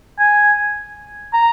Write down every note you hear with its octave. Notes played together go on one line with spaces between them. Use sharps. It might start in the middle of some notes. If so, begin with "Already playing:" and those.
G#5
A#5